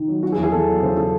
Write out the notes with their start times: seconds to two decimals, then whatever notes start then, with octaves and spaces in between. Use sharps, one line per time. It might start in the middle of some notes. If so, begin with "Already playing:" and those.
Already playing: D#3
0.08 F#3
0.23 F#3 F#4
0.32 G#4
0.37 E2
0.43 G#4
0.52 E2 A4
0.68 F#3
0.82 C#3 C5
0.97 C#3 A4